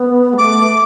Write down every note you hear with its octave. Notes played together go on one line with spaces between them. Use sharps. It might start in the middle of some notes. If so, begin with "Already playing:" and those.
Already playing: B3
G#3
A3 D6